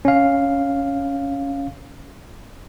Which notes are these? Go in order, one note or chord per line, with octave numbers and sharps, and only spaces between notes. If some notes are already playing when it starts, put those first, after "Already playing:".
C#4 F5